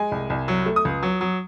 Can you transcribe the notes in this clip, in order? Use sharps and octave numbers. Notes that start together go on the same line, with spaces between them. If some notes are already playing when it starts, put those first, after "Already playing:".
Already playing: G#3 G#5
C2
C2
F#3
A3
D#6
C#2
F#3
F#3